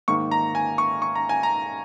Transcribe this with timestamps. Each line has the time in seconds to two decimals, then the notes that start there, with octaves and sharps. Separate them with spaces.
0.08 G#2 D#3 A#3 C#6
0.31 A#5
0.55 G#5
0.78 C#6
1.02 C#6
1.15 A#5
1.29 G#5
1.43 A#5